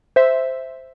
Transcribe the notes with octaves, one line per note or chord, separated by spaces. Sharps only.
C5 E5